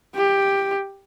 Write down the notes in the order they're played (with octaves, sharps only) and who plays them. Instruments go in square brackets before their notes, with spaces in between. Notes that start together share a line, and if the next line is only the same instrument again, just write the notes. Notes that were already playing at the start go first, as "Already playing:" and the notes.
[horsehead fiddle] G4